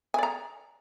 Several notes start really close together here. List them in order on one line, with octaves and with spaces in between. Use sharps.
G#5 D5 A#5